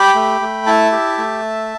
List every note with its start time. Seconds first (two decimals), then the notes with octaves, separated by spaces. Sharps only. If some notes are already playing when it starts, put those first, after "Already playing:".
Already playing: G4 G5 B5
0.15 A3
0.41 A3
0.66 E4 E5 A5
0.92 G4
1.18 A3